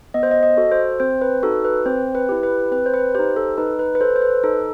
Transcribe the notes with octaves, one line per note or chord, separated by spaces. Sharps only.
B3 D#5
C5
D#5
D#5
F#4 A4
C5
C4 C5
B4
D#4 F#4 A4
B4
C4 C5
B4
E4 G4
B4
C4 B4
C5
B4
D#4 G4 C5
A4
D#4 B4
B4
B4
A4 C5
C5
B4
D#4 A4